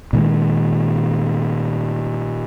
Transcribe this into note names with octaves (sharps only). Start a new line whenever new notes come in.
A#2 D#3 G#3